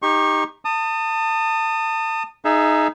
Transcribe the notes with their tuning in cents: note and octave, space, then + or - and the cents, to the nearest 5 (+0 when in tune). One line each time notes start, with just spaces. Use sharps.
D#4 +0 G4 +20 C#6 -25
A5 +30 D#6 -15
D#4 +0 G#4 +15 E5 +20